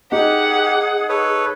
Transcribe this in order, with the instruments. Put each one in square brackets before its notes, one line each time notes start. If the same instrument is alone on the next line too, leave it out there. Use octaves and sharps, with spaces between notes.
[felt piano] D#4 [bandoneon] G4 [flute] G#4 [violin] F#5
[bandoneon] A4 B4 C#5